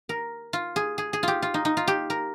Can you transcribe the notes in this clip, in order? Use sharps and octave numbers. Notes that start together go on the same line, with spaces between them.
A#4
F4
G#4
G#4
G#4
F4 G4
F4
D#4
D#4
F4
G4
A#4